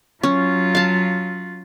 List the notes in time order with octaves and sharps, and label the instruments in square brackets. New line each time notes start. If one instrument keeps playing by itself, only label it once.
[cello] F#3 F4 [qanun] C#4
[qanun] F5 A5